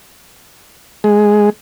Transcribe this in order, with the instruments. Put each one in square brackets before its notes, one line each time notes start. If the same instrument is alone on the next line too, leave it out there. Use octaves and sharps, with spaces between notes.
[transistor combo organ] G#3